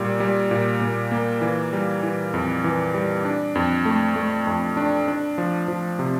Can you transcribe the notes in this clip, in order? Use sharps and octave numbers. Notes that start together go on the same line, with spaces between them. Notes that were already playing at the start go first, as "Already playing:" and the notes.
Already playing: A#2 G3
G3
A#2
A#2
A#3
E3
G3
E3
F2
E3
G3
D4
F2
A3
A3
F2
D4
D4
F3
F3
C3